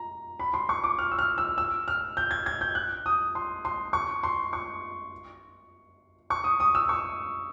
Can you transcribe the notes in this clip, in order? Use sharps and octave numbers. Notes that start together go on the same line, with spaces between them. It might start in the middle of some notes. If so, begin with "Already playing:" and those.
Already playing: A#5
B5
C6
C#6
D6
F6
E6
F6
E6
E6
F6
G6
G#6
G#6
G6
F#6
D#6
C6
C6
C#6
C6
C#6
C#6
D#6
D#6
E6
C#6